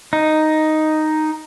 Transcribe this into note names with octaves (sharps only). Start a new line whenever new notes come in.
D#4